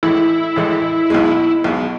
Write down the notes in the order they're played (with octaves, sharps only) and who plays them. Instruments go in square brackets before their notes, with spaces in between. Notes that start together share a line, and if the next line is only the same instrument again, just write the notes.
[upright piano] A1 A2 E3 G#3 [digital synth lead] E4
[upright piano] A1 A2 E3 G#3
B1 B2 G#3
B1 B2 G#3